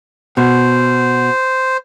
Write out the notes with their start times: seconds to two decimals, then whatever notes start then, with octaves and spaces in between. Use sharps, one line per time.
0.37 B2 C5